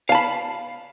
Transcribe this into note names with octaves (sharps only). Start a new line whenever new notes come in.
F5 A5 B5